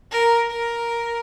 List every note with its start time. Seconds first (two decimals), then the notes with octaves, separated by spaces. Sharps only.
0.11 A#4
0.50 A#4